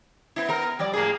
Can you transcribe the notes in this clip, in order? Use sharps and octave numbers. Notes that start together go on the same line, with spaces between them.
B3 E4
B3 A#4
F3 G3 D5
A2 A#3 G#4